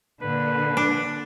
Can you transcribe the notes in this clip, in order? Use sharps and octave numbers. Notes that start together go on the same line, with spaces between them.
A#2 D3 B4
D4